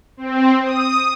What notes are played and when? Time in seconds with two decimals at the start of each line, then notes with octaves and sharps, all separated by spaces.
0.17 C4
0.63 D#6